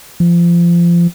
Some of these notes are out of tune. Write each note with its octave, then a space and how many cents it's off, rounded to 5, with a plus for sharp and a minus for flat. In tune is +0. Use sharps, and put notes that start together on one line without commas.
F3 -25